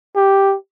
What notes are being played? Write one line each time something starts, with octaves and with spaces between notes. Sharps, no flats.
G4